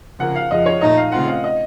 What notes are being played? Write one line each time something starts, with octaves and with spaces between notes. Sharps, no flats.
C#3 F3 A#3 F#5
F5
F2 C#3 F3 D#5
C#5
A#2 A3 D#4 D#5
F5
C#3 A3 C4 F4 F#5
F5
D#5